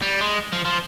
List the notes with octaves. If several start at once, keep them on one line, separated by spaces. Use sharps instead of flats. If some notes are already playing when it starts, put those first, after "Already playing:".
G3
G#3
F3
F3